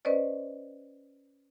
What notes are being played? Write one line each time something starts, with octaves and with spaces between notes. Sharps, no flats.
C#4 B4 C5 D5 D#5